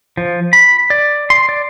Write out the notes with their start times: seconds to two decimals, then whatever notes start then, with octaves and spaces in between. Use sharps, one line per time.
0.17 F3
0.53 B5
0.90 D5
1.30 C6
1.49 D5